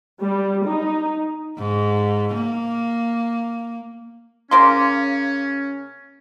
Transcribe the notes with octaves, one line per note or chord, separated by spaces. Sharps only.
G3
D#4
G#2
A#3
C#3 A#3 C#4 C6